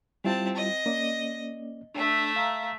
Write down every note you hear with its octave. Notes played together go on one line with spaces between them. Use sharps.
G3 C4 E4 F4 A5
D#5
A#3 C#4 D5
A3 D4 E5
F5 A#5